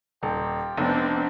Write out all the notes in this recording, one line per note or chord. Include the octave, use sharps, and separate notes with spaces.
D#1 F4 G4 G5
F1 B3 C4 D4